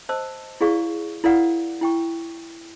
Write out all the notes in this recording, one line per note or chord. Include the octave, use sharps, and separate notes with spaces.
C5 D#5 A5 E6
E4 G#4 D5 F5 C#6
E4 A#4 D5 F5 F#5
E4 G5 C#6